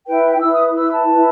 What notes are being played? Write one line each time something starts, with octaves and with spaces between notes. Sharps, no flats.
E4 B4 G5
E4 B4 E6
D#6
E4 B4 E6
A5
E4 B4